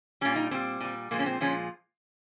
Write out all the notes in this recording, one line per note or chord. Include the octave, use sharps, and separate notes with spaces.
A#2 G3 C#4
D#4
A#2 G3 C4
A#2 G3
A#2 F3 G#3 A#3
C#4
C4
A#2 F3 G#3 C#4